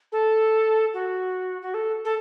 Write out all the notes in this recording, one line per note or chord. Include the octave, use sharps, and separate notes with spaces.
A4
F#4
F#4
A4
A4